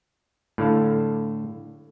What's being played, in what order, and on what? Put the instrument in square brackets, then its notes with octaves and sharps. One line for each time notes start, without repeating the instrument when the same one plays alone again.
[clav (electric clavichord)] A2 D3 F5 A5